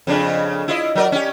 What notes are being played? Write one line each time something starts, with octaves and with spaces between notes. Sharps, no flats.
F2 C#3 D4
E4 F4 D#5
F#3 A#4 D5
C#4 G4